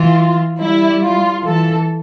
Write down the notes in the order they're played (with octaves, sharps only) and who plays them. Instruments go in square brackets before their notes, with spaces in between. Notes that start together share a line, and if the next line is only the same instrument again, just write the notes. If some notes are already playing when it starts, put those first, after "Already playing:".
Already playing: [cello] E3 [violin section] F4
[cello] G3 [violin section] E4
[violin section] F4
[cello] E3 [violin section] A4